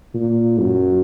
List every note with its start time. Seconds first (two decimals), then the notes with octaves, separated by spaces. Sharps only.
0.14 A#2
0.60 F#2